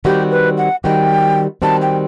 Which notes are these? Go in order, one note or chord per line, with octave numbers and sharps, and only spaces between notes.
D#3 G3 C4 F#4 G4
B4
F#5
D#3 G3 C4 F#4 G5
D#3 G3 C4 F#4 A5
G5